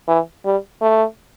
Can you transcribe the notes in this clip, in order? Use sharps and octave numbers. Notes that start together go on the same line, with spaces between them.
E3
G3
A3